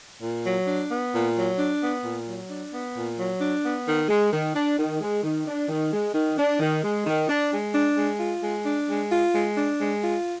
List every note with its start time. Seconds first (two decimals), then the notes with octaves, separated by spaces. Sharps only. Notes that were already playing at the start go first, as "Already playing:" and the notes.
0.22 A#2
0.45 F#3
0.68 D4
0.91 B3
1.13 A#2
1.36 F#3
1.59 D4
1.81 B3
2.04 A#2
2.27 F#3
2.50 D4
2.72 B3
2.96 A#2
3.19 F#3
3.41 D4
3.64 B3
3.87 D#3
4.09 G#3
4.32 D#3
4.55 D4
4.78 D#3
5.01 G#3
5.23 D#3
5.46 D4
5.69 D#3
5.92 G#3
6.14 D#3
6.37 D4
6.60 D#3
6.83 G#3
7.06 D#3
7.29 D4
7.52 G#3
7.75 D4
7.97 G#3
8.20 F4
8.42 G#3
8.66 D4
8.88 G#3
9.11 F4
9.34 G#3
9.57 D4
9.79 G#3
10.02 F4